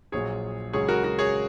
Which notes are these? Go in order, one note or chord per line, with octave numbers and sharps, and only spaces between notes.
A#1 A#2 F#3 G#4 C#5
C#2 C#3 F#3 G#4 C#5
F#4 A#4
F#4
G#4 C#5